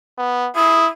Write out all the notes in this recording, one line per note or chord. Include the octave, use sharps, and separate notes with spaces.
B3
E4 D#6